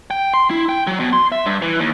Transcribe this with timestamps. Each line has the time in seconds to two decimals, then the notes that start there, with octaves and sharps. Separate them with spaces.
0.11 G5
0.34 C6
0.50 E4
0.69 G5
0.87 F#3
1.00 B2
1.13 C6
1.32 E5
1.46 G2
1.62 E3
1.79 D#2